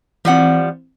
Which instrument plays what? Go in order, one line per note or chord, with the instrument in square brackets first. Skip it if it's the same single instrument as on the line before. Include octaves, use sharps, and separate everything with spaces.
[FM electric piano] E3 C4 [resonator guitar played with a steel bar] F3 G3 F#5